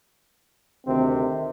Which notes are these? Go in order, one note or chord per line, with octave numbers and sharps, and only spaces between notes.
D2 C3 D#3 C4